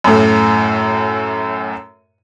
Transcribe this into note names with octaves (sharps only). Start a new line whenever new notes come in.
F#2 A2